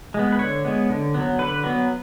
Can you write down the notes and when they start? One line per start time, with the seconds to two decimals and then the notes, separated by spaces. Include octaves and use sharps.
0.14 G#3 B3
0.32 B4
0.39 D3 C#5
0.65 G#3 B3
0.90 D3
1.14 F#3 B3
1.39 D3 B4
1.64 F#3 B3